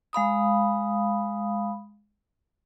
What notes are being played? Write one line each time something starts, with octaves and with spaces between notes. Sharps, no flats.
G#3 F5 B5 D#6